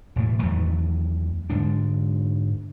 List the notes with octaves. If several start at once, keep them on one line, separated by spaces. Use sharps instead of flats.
E1 A2 A3
E2 D#3 F#3 A3
G#2 D3 G#3 D4